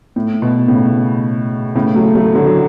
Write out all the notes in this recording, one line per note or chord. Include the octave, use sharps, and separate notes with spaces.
A2
B2
A2 C#3
A2 C#3
F#3 A3
F#3 A3
D3 F#3
F#3